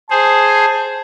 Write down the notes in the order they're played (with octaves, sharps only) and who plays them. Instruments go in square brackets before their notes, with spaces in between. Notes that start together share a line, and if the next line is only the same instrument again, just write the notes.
[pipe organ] G#4 C5 [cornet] A5